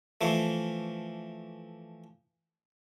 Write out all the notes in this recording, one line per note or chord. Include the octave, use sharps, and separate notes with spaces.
E3 F3 A3